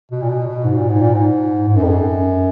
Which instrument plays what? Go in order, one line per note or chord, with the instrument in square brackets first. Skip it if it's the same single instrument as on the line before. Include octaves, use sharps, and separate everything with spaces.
[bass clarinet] B2
A#2
B2
B2
G#2
A#2
G#2
A#2
G#2
G#2
F#2
F2
F#2